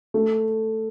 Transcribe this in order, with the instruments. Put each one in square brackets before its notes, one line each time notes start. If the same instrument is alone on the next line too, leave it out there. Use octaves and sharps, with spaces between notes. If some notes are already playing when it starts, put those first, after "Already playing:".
[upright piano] A3